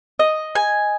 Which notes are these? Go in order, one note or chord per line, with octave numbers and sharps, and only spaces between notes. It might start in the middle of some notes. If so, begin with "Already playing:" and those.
D#5
G#5